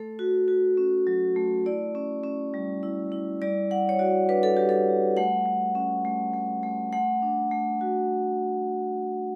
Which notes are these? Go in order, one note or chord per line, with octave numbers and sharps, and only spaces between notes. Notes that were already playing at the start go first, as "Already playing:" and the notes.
Already playing: A3 A4
F#4
F#4
C#4
F#3
A3
E4 D5
C#4
C#4
G3
E4
E4
G3 D5
G3 F#5
C#5
F#4 D5
D4 B4
A4
G3 G4
A4
G3
A3 F#5
A3
C#4
A3
A3
A3
A3 F#5
D4
A3
F#4